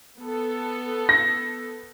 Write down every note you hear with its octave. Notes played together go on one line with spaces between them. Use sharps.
B3 A4
A#6